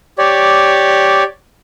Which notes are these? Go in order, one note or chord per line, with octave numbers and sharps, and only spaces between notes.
G4 C#5 D5